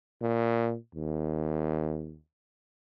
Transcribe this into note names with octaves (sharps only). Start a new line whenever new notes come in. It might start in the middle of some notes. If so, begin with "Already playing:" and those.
A#2
D#2